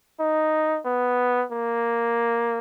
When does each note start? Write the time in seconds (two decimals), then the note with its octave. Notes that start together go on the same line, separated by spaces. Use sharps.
0.20 D#4
0.86 B3
1.52 A#3